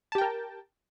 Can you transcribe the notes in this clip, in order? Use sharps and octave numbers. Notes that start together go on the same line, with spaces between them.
G4 A#4 G5 A5